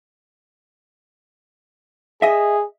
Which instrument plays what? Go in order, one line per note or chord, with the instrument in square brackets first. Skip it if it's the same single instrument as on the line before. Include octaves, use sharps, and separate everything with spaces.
[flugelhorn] G#4 [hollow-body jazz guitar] D#5 E5